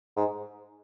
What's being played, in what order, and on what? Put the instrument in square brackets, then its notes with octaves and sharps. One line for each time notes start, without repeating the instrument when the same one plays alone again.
[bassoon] G#2